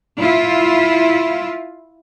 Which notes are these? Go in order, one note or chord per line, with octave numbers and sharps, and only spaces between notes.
E4 F4